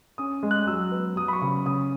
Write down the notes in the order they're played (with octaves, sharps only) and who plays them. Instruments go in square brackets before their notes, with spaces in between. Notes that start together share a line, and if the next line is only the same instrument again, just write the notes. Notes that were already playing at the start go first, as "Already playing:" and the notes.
[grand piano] C#4 D#6
G#3
F#6
F#3 E6
B3
F#3 D#6
B5
C#6
C#3
C#3 D#6